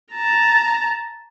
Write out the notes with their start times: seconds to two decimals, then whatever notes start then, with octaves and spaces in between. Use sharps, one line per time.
0.14 A5 A#5